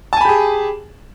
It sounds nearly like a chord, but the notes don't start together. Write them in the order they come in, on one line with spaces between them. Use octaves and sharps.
A5 G#5 B5 G4 G#4